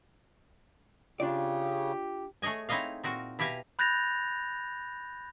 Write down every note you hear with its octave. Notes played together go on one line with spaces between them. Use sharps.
C#3 D4 F4 G4 D5
A3 G#4 C#5 D#5 G#5
C4 D#4 E4 C#5 D#5 F5
A#2 C4 F#4 A#4
B2 E4 G4 F5 G#5 A#5
B5 F#6 G6 A6 A#6 F7